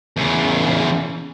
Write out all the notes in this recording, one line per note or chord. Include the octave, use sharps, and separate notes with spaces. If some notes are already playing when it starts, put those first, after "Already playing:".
E2 C#3